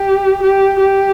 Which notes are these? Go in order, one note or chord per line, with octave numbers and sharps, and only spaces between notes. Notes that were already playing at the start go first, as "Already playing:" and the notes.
Already playing: G4
G4
G4